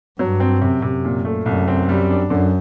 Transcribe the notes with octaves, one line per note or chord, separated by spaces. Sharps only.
G2 F#3
C4
F#2 C3
C3
A#2
A3
C2 F#2
C4
G3
D4
F#2 D3